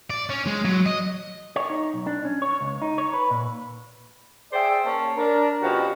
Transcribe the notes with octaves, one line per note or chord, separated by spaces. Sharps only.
D5
C#4
G#3
F#3
D#5
C#5
D#4
B1
D4
C#4
C#5
C#2
D#4
C#5
B4
A#2
G#4 C5 D5 E5 G5
A#3 C#4 A5
D4 A#4
B2 F3 C#4 F#4 G4